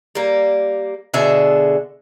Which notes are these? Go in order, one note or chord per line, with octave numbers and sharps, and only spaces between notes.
G3 A#3
B2 D3 G#4 E5